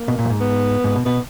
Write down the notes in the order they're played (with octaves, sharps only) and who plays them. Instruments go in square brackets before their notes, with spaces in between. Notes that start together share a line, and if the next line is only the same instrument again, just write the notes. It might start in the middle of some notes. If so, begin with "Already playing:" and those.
Already playing: [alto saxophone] A#3
[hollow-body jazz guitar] B2
A#2
F#2
G#2
[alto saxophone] B3
[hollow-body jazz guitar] G#2
B2
[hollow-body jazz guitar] B2 [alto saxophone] B3